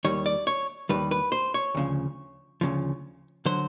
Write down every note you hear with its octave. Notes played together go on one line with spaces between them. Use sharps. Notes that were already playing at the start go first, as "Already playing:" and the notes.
D#2 D#3 G3 C#5
D5
C#5
D#2 D#3 G3 B4
B4
C5
C#5
D2 C#3 F3
D2 C#3 F3
D3 F#3 C5